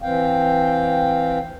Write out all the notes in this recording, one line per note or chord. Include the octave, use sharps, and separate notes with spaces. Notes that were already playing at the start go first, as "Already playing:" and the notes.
E3 C4 F5 G5